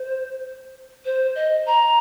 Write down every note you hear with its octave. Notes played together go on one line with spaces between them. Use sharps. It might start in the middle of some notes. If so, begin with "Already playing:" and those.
Already playing: C5
C5
D#5
A#5